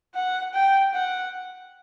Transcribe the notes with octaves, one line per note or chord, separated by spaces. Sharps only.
F#5
G5
F#5